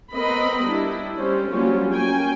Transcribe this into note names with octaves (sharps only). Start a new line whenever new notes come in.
B3 C4 A#4 D#5 B5
G3 D4 E4
G3 C#4 C5
F#3 G3 A#3 C#4 F4
A#3 C#4 G5 G#5